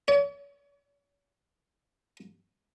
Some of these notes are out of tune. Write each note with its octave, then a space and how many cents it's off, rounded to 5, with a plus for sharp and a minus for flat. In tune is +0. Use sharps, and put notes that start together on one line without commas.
C#5 +40